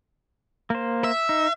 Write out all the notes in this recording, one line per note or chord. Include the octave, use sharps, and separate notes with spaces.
A#3 C5
E5
D#4